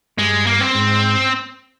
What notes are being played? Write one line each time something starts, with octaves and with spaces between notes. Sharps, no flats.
G2 G3 G#3
A#3
C4
G#2 G#3